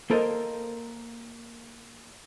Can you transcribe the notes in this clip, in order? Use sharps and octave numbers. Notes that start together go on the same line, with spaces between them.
A#3 A4 A#4 C5 D#5